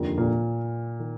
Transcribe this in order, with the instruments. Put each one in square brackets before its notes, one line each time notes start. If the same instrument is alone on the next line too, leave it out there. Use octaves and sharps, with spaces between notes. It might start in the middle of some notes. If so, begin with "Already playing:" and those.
Already playing: [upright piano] F1 D#2 D3 F3 A#3
[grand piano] A#2
[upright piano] D#3